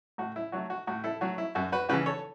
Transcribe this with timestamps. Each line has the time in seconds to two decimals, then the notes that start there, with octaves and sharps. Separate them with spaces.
0.18 A2 F#4
0.36 E4
0.52 F#3 A3 F#4
0.70 F#4
0.87 A2 F#4
1.04 E4 A4
1.21 F#3 A3 F#4
1.38 E4
1.55 F#2 F#4
1.72 F#4 B4
1.89 C#3 E3 F#4 B4
2.06 A4 C#5